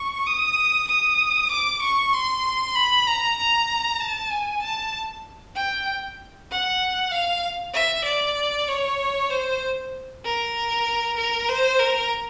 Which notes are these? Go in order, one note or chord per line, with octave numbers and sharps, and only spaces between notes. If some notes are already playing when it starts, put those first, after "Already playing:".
Already playing: C#6
D#6
D#6
D6
C#6
C6
B5
A#5
A#5
A5
G#5
A5
G5
F#5
F5
E5
D5
C#5
C5
A#4
A#4
C5
A#4